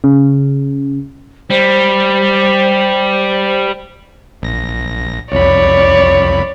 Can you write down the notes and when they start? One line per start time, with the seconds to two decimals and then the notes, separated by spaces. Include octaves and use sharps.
0.04 C#3
1.50 G3 C5
4.42 A#1 A#6
5.32 C2 F2 C#5 D5 B5